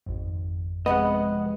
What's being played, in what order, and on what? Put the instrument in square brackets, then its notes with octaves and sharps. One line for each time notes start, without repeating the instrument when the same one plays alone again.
[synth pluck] G#1 F2
[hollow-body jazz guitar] F2 C3 D#5 [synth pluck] G#3 [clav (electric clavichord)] B3 F#5